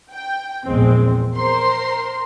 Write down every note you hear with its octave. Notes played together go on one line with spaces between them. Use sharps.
G5
A#1 E2 G#3 C4
A#4 C5 C6